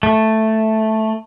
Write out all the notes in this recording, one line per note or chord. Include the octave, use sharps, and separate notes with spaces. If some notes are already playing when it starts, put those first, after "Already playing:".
A3